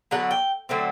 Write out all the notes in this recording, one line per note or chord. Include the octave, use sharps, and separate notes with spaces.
D3 F#3 B3 D4 F#5
G5
D3 F#3 A3 C4